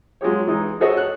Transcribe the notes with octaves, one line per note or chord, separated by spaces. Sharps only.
F#3 G#3 F4 G4 C#5
E3 G#3 D#4
F#4 G#4 A4 C5 C#5 D#5
F#6